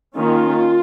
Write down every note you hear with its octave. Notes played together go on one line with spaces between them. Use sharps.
D#3 A#3 C#4 F4